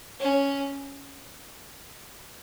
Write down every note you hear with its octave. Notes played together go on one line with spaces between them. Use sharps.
C#4